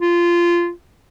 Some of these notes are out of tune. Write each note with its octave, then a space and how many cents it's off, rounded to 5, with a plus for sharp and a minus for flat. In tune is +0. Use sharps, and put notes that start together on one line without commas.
F4 -15